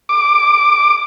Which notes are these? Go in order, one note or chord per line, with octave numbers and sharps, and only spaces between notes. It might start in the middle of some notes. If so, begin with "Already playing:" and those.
D6